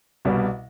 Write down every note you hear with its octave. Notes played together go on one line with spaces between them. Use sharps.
C2 B2 G3